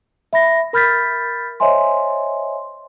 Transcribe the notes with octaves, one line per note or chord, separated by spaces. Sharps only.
E5 B5 A#6
A#4 B5 F6 G6 A6 B6
C5 C#5 D#5 E5 G#5 C6